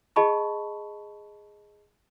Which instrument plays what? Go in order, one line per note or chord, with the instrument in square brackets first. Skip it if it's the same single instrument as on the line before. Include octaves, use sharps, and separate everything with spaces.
[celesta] G#4 D#5 A5 B5 C#6